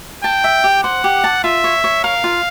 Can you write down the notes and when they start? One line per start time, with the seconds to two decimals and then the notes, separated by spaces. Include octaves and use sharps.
0.24 G5 A5
0.44 E5
0.64 G4
0.83 C5 F#5
1.04 G4
1.24 A5
1.44 F4 E5
1.64 C#5
1.84 C#5
2.04 A#4 F5
2.24 F4